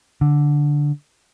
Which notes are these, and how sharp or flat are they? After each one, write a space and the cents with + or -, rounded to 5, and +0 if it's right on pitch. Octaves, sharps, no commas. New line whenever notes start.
D3 -5